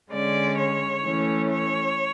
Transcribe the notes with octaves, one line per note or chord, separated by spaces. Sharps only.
D3 G#3 C#4 D5
C#5
E3 A3 C#4
C#5